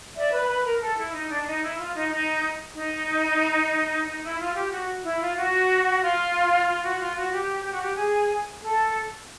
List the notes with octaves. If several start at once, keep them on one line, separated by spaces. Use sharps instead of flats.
D5 E5
B4
B4
A#4
A4
E4
D#4
D4
D#4
E4
F4
D#4
D#4
D#4
D#4
E4
F4
G4
F#4
E4
F4
F#4
F4
F4
F#4
F4
F#4
G4
G4
F#4
G4
G#4
A4